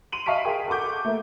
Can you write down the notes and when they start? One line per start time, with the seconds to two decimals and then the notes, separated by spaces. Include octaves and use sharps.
0.12 C6 D#7 F7 F#7
0.26 D#5 F5 A5 C#6 B6 D7
0.45 G#4 A#4 G5
0.68 A4 F#5 C#6 D6 G6
1.05 A3 A#3